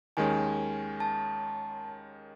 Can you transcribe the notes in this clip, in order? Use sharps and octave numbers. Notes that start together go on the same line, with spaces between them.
D#2 D#3 G#3 C#4 G#5
A5